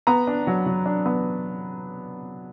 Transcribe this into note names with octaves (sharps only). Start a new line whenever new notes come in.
B3 A#5
D4
F#3
F#3
D4
B3